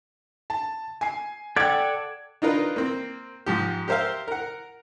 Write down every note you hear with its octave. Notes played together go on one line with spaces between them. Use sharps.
A5
G#5 C7
A4 D5 F#5 G5 G#6
D4 D#4 F4 A#4 B4
A#3 C4
G#2 F3 G4
G4 A#4 C5 E5 F5
A#4 F#5